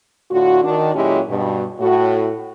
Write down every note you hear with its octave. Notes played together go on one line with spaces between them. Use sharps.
A2 D3 F4 F#4
D#3 D4
A#2 F#3 G#3 C#4 E4 G4
G2 B2
A2 F#4